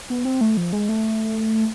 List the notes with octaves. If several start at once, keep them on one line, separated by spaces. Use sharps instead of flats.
B3
C4
A3
F3
G#3
A3